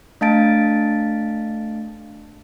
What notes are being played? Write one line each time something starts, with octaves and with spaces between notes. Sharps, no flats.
A3 D4 F5 A5 A6 D7